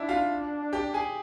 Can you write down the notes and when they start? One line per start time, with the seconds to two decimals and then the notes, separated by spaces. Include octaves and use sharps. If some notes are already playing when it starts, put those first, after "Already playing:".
Already playing: D4 E4 E5
0.09 F4 F5
0.73 G4 G5
0.94 G#4 G#5